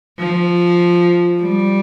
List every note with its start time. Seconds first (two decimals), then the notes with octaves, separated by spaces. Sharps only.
0.20 F3
1.42 G3